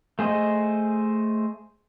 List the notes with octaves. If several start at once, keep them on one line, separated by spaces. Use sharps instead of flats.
A3 G#4 C5 D#5